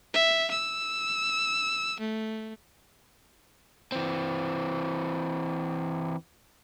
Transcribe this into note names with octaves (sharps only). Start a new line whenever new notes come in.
E5
E6
A3
E3 C4